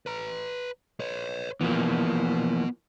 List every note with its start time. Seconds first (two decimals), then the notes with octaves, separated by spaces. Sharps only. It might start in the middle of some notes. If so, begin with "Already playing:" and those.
0.06 B4 A#5
1.00 B4 C#5
1.61 E3 F3 A#3 B3 F#4